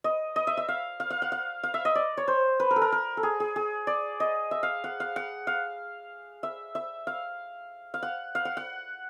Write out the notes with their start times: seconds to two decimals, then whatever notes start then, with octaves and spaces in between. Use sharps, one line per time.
0.04 D#5
0.36 D#5
0.47 E5
0.57 E5
0.68 F5
1.00 F5
1.10 F5
1.22 F#5
1.32 F5
1.63 F5
1.74 E5
1.85 D#5
1.95 D5
2.17 C#5
2.28 C5
2.60 B4
2.71 A#4
2.76 A4
2.81 A#4
2.92 A#4
3.17 A4
3.23 G#4
3.40 G#4
3.56 G#4
3.87 D5
4.20 D#5
4.51 E5
4.63 F5
4.84 F#5
5.00 F5
5.16 F#5
5.47 F5
6.43 E5
6.75 E5
7.07 F5
7.94 F5
8.03 F#5
8.35 F5
8.45 F#5
8.57 F#5